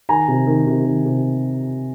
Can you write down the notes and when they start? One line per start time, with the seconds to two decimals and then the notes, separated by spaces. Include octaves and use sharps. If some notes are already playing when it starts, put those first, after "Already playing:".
0.09 D#3 G#5 A#5
0.28 C3
0.47 D#3
0.67 C3
0.86 D#3
1.05 C3